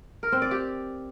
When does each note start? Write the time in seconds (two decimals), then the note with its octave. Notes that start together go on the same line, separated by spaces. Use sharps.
0.23 A#4
0.32 C4
0.42 D5
0.51 G4